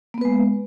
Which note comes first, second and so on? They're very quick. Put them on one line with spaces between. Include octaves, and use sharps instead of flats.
A#3 B3 B4 G#3